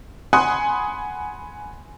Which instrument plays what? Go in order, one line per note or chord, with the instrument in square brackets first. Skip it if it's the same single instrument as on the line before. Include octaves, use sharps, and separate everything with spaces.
[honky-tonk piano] F#5 G#5 B5 C6 D#6 F#6